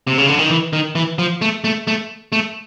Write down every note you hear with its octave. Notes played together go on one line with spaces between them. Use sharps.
C3
C#3
D3
D#3
E3
D#3
E3
F3
A3
A3
A3
A3